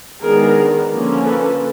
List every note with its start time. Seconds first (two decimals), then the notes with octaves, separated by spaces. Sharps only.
0.21 D#3 G#3 B3 D4 G#4 A#4
0.90 D3 F3 A#3 C#4
1.24 A4 B4